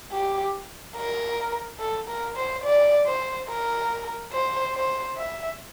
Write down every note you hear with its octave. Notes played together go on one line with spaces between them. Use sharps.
G4
A#4
A4
A#4
C5
D5
C5
A#4
C5
C5
E5